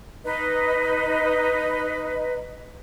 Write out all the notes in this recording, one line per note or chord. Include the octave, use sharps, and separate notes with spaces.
D#4 B4 D#5